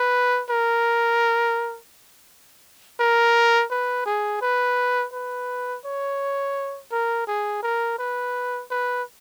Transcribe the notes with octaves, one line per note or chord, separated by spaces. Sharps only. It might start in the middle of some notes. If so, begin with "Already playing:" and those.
Already playing: B4
A#4
A#4
B4
G#4
B4
B4
C#5
A#4
G#4
A#4
B4
B4